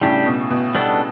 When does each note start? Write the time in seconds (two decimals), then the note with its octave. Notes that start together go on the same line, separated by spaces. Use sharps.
0.01 A2 C#3 G3 D4 G4
0.26 B2
0.50 B2
0.75 G3 B3 D4 A4